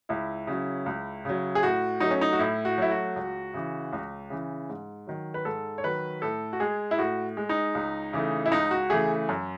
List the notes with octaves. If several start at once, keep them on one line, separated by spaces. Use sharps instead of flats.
C#2 E4
C#3 F#3
C#2
C#3 F#3
G#4
A2 F#4
F#3 A3 D#4
C#4
D#4
F#4
A2 E4
F#4
F#3 A3 E4
F#4
C#2
C#3 E3
C#2
C#3 E3
G#2
D#3 F#3
B4
G#2 A4
C#5
D#3 F#3 B4
A2 A4
F#4
G#3 G#4
E4
A2 F#4
G#3
D#4
C#2
C#3 E3 A3
E4
C#2 D#4
F#4
C#3 E3 A3 G#4
F#2